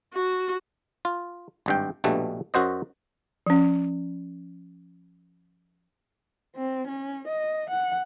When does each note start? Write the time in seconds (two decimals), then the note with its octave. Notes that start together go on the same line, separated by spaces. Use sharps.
0.14 F#4
1.05 F4
1.66 G#1 G2 G5
2.04 A#1 G2 B2 G3 A3
2.54 F#2 F#4 C5 D#5
3.47 F3 C#4
6.56 C4
6.88 C#4
7.28 D#5
7.70 F#5